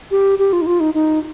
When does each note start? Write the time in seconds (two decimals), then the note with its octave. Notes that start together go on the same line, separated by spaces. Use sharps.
0.11 G4
0.39 G4
0.53 F4
0.62 D#4
0.66 F4
0.80 D#4
0.94 D#4